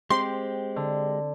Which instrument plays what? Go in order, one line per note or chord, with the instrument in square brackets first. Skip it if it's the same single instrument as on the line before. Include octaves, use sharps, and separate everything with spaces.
[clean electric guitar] G#3 G4 [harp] C4 [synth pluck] C6
[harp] D3